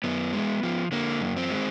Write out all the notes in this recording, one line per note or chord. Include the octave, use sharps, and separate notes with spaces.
F#2 B3
G#3
F3
D3 A#3
F#2
C4
G#3